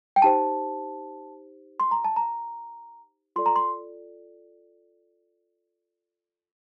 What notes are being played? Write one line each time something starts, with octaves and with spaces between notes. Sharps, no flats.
G5
D#4 G4 C5 A5
C6
A#5
A5
A#5
F4 A4 D5 C6
A#5
C6